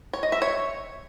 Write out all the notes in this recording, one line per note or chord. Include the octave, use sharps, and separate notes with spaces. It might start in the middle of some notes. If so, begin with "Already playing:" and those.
C#5
D#5
E5
C#5